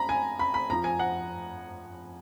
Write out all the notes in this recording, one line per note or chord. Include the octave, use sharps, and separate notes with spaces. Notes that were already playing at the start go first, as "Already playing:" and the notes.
Already playing: A#5 B5
G#5
B5
B5
F2 F3 A#5
G#5
F#5